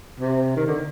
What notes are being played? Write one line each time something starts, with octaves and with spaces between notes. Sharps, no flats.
C3
D#3
D3